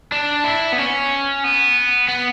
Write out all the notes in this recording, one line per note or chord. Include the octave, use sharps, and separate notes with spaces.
D4
E4
B3
C#4
B3
B3